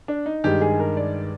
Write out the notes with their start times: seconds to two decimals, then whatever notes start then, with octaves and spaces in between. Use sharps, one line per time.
0.08 D4
0.26 D#4
0.44 G2 D#3 G#3 G4
0.61 G#4
0.80 A#4
0.97 D5